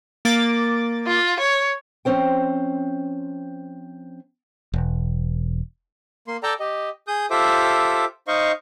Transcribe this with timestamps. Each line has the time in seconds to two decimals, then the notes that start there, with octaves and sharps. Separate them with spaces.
0.25 A#3 D6 A6
1.07 F4
1.40 C#5
2.05 F3 C4 C#4 C5 G5
4.74 E1
6.28 A#3 C6
6.43 A4 D5 G5 A5 A#5
6.60 G4 D#5
7.07 G#4 D#6 G6
7.30 F4 G4 A4 C5 E5 D6
8.28 D#4 C5 D#5 F5 C#6